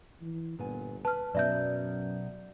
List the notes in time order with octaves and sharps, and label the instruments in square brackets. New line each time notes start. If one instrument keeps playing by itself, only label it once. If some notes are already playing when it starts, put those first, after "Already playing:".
[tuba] E3
[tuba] G1 [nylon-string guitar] A#2 B3 G#5
[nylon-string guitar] B4 [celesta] A5 F6
[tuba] F#2 [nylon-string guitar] B2 F#3 B3 [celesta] D5 E5 G6